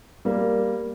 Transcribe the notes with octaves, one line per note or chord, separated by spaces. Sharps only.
G3 A#3